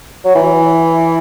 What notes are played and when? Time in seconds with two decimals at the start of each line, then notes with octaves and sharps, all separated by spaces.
0.24 F#3
0.35 E3